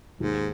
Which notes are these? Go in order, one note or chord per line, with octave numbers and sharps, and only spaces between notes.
D#2 G#2